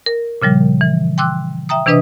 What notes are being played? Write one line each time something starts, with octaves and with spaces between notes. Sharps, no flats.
A#4
A#2 C#3 F3 G3
E3
G5 C6 D6 E6 F#6
E5 G5 A#5 D#6
C3 E3 D4 B4 D#5 D#6